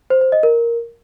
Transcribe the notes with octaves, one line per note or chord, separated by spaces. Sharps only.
C5
C5
D#5
A#4